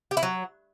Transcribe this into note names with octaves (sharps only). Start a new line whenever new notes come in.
G4
E4
F#3